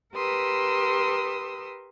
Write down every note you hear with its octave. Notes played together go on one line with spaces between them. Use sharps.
G4 A#4 B4 C6 D#6 E6